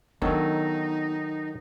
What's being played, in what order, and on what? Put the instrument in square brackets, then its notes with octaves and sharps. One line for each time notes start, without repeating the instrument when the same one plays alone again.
[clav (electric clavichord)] D#3 F#3 A4 [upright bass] B3 D4 [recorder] D#4